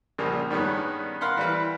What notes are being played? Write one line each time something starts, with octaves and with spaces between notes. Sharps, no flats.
A#1 A#2 C#3 F3 G3 A#3
G2 D#3 G3 G#3 B3 C#4
A#4 F5 F#5 B5 C6
E3 G3 B4